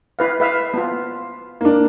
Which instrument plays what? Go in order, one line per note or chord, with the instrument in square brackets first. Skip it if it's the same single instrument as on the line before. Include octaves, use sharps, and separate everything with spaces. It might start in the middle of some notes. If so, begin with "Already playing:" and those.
[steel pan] E4 B4 F5
B4 E5 F5
B3 F4
[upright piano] A#3 D4